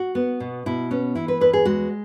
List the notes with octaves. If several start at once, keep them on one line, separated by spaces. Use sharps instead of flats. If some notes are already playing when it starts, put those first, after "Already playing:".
Already playing: F#4
B3
B2
B2 E4
B3 C#4
E3 E4
B4
E2 B4
G#4
G#3 F#4